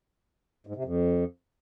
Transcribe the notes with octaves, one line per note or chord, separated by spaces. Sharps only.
G#2
C3
F2